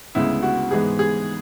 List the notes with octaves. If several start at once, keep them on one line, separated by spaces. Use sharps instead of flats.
D2 C#3 G#3 B3 E4
F#4
G#2 E3 G#3 B3 G#4
G#4